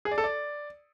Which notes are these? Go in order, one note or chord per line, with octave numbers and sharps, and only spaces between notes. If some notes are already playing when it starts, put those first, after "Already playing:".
G#4
D5
A4
D5